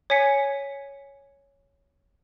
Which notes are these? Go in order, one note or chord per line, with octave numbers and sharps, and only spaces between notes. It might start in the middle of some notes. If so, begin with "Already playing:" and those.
C#5 G#5 B6 C#7